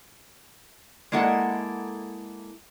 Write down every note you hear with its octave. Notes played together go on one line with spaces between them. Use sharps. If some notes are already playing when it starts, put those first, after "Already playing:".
G#3 A#3 E4 A4 F#5